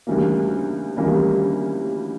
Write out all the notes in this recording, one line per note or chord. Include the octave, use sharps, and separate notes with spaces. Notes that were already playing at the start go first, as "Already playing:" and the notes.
D2 C#3 E3 G3 A#3
D2 C#3 E3 G3 A#3